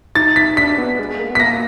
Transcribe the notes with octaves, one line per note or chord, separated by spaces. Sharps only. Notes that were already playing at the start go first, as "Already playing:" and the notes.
D#4 A6
B6
D4 B6
B3
G#3
A#3
B3 B6
A#3 A#6